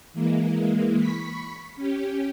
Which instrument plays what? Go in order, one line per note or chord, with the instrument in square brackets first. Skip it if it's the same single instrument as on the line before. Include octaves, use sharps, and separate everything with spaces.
[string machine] E3 G#3 A#3
B5 C#6 B6
C#4 G4